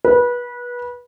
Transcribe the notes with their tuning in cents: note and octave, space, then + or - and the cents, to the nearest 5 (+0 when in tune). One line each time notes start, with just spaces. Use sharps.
B4 -25